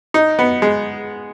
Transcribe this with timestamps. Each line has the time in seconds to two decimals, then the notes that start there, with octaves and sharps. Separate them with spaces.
0.14 D#4
0.39 B3
0.62 G#3